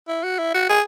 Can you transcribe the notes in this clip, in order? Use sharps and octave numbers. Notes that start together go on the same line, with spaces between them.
E4
F#4
E4
F#4
G#4